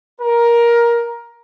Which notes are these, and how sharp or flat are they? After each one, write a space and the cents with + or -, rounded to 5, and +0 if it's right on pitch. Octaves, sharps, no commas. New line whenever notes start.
A#4 +15